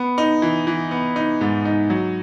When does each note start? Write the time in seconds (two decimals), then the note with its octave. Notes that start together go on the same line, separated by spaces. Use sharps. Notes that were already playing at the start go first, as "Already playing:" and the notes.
Already playing: B3
0.18 D#4
0.42 E3
0.67 E3
0.91 B3
1.16 D#4
1.41 G#2
1.65 D#4
1.90 F#3